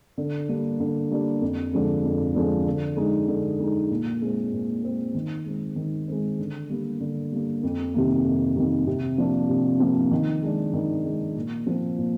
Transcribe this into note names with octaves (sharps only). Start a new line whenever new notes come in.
D3
G3 A#3 D4
D3
G3 A#3 D4
F2
D3 F3 G#3
F2
D3 F3 G#3
D3
G#3 D#4
D3
G#3 D#4
A#2
G#3 C4
A#2
G#3 C4
D#3
G#3 C4
D#3
G#3 C4
D3
G3 A#3
D3
G3 A#3
F2
C3 D#3 G3 A#3
F2
C3 D#3 G3 A#3
C3
F3 A#3 D4
C3
F3 A#3 D4
D#3
G#3 D4
D#3
G#3 D4
A#2
F3 C4
A#2